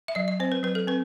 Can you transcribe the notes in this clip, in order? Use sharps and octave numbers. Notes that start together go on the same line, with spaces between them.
E5
F#3 D#5
D#5
C4 C5
B4
F#3 B4
A4
C4 B4